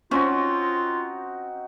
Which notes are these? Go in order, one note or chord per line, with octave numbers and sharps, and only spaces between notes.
C4 C#4 D#4 F4 F#4